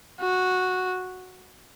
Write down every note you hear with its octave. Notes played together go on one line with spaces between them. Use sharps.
F#4